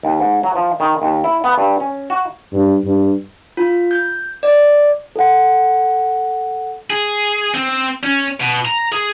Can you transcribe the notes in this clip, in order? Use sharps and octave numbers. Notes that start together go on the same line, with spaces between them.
D#2
G#2
F#3
F3
D#3
D#2
E4
B3
G2
C#4
F#4
G2
G2
F4
G6
D5
A4 F#5
G#4
C4
C#4
B2
A#5
G#4